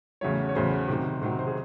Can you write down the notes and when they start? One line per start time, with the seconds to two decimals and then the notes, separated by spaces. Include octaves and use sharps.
0.21 E2 C#3 F#3 A3 C#5
0.49 C#5
0.55 E2 C#3 F#3 A3 C5
0.88 C3 D#3 F#3
1.22 C3 D#3 F#3 C5
1.39 C5
1.47 G#4